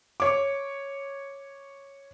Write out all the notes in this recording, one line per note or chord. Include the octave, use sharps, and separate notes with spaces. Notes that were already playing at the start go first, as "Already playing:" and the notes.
C#5 D6